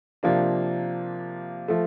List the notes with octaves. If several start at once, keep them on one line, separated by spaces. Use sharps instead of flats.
C3 F3 A#3 D4
F3 A3